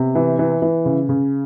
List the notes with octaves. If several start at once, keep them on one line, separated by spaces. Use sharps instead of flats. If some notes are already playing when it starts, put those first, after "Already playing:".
Already playing: C3 B3
E3
E3
E3
C#3
C#3